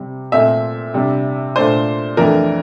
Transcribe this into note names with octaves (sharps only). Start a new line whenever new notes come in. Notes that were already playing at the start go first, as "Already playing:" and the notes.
Already playing: C3 G3 C4
A#2 A3 C4 E5
C3 G3 D4
A#2 A3 D4 C5
F2 E3 A3 D4 A#4